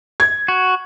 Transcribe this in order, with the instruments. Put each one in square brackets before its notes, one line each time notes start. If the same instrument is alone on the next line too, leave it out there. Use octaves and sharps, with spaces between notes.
[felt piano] G#6
[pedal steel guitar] F#4